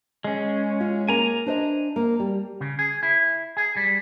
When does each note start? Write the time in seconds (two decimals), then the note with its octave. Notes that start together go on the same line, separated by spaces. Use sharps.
0.24 G#3 C#4
0.80 F4
1.08 A#3 G#5 A#5
1.46 D4 C5 D#5
1.96 A#3
2.20 G3
2.60 C#3
2.79 G#4
3.03 E4
3.57 G#4
3.77 G3